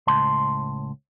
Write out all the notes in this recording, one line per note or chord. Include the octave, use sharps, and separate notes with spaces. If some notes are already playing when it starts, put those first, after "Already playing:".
C#2 A2 A5 C6